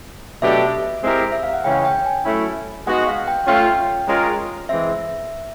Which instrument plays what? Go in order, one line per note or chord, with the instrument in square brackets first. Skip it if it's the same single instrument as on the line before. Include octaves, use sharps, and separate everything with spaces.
[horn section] B2 F#3 A3 D4 G4 [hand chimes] E5
[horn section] G#3 C4 E4 G4 A#4
[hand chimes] E5
F5
F#5
[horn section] C#3 E3 G#3 C#4 [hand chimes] G5
[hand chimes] G5
G#5
[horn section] F#3 A3 C#4 E4
[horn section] G#3 B3 D#4 F#4 [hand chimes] F#5
[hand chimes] F5
G5
[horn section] A3 C#4 F4 [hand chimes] G5
[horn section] G#3 C#4 F4 A#4
[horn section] E3 G#3 C4 [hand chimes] E5